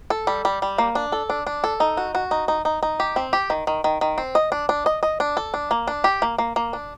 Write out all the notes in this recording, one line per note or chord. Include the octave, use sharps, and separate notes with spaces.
A4
G3
G3
G3
A#3
D4
A4
D4
D4
A4
D#4
F#4
F#4
D#4
D#4
D#4
D#4
G4
C4
G4
D#3
D#3
D#3
D#3
C4
D#5
D4
D4
D#5
D#5
D4
A4
D4
A#3
D4
G4
A#3
A#3
A#3
D4